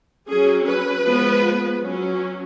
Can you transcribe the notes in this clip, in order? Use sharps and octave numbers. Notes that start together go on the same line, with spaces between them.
F#3 C#4 G#4
B4
F3 G#3 B3
F#3 C#4